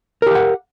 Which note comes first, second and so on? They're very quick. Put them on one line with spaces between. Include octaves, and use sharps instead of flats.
A#4 G4 F5 F#5